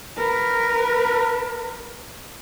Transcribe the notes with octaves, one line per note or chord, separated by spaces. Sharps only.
A#4 B4